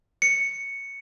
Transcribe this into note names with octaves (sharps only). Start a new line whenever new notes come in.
C#7